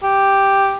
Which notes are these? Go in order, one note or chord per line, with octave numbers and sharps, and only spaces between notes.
G4